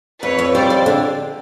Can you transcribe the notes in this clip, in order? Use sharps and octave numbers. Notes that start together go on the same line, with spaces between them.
F2 B4 C#5
F2
G3 C5 D5
F2
D3